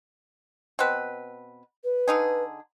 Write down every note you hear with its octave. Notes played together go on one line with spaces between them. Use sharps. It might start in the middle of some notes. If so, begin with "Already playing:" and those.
B2 C4 B4
B4
D3 D#4 G#4